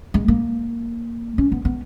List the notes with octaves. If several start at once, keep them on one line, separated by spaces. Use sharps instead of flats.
G#3
A#3
C#4
B3
B3